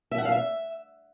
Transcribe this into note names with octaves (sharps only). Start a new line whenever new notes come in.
E5
F#5
F5
E5